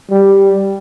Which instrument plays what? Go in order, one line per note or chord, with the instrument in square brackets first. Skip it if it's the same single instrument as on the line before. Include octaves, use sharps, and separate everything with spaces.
[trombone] G3